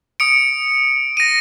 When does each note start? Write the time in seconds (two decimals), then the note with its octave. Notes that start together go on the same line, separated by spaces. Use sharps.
0.20 D#6 C#7 D7
1.17 A#6 D#7